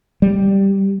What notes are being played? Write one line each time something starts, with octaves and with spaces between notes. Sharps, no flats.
G3